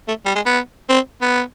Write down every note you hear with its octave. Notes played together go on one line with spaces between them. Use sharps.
A3
G3
G#3
B3
C4
B3